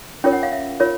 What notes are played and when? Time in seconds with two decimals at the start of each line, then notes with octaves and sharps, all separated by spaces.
0.24 C#4 F4 A#4 C#5 G5
0.33 F#5
0.43 F5
0.52 E5
0.80 F4 A#4 C#5